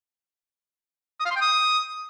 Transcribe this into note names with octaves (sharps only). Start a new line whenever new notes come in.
D#6
F5
C6
G5
D#6